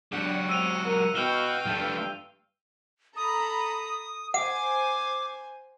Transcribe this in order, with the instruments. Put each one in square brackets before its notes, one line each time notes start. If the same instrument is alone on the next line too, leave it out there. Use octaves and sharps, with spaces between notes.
[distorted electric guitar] F#3 G4 [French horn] D4 [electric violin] F#5
[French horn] C4 [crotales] E6 D#7 F7
[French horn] A#4
[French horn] B2 [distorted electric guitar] F#4 [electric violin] F5 G5 [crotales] G7
[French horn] G2 [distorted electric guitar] F3 A3
[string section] A4 A#5 B5 [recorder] D#6
[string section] C5 G#5 [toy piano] F#5 [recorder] D6